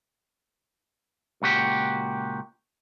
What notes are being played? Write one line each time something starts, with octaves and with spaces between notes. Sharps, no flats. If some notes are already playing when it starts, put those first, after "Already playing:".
C#2 A#2 F#4 G4